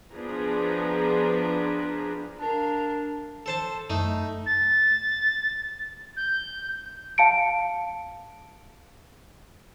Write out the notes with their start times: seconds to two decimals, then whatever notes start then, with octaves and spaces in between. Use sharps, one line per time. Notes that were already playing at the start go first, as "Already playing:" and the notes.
0.13 F3 B3 D4 G#4 B4 A#5
2.39 D4 A#4 F5
3.46 A4 C5 A5
3.90 F#2 A3 D#4
4.46 A6
6.17 G6
7.18 F5 A5 C#7 D7